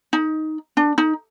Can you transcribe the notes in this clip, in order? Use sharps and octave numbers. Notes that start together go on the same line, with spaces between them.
D#4
D4
D#4